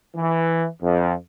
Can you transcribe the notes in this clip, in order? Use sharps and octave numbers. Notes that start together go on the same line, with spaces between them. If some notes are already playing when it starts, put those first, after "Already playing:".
E3
F2